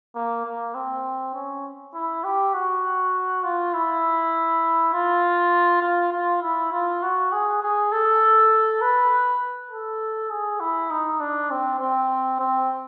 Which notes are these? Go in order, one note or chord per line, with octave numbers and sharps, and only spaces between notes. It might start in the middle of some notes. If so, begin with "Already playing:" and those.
A#3
A#3
C4
C#4
E4
G4
F#4
F4
E4
F4
F4
F4
E4
F4
F#4
G#4
G#4
A4
B4
A4
G#4
E4
D#4
D4
C4
C4
C4